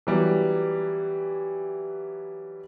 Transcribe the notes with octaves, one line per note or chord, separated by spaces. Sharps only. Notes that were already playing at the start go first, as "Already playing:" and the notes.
E3 F#3 G3 B3